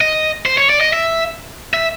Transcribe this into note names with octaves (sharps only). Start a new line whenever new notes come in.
D#5
C5
C#5
D5
D#5
E5
E5